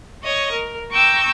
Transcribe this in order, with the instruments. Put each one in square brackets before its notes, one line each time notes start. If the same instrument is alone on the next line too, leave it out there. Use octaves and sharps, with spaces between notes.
[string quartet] C#5 D#5 C#6
A#4
G5 A#5 C#6 D6 E6 G6